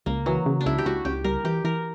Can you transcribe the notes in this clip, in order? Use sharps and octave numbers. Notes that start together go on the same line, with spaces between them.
C#2 A#3
E3 F#3
C#3
D4
C#2 E4
G4
C#2 F#4
C#2 G4
G3 A#4
E3 G4
E3 A#4